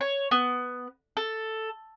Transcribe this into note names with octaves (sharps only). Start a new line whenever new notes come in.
C#5
B3
A4